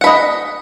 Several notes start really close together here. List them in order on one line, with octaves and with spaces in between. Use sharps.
F#5 B5 D#5